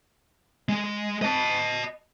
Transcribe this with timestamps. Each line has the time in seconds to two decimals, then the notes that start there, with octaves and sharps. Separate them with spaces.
0.69 G#3
1.22 D#5 A5